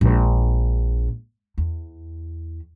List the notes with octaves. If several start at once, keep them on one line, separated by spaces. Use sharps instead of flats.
A#1 G#3
E2